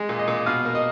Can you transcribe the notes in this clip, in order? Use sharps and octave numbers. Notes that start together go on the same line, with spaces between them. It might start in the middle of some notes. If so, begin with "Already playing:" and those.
Already playing: G#3
A#2
D#5
A#2
B2 F5
A#3
D#5